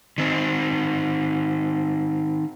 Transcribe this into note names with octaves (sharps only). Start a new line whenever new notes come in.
D#3 C4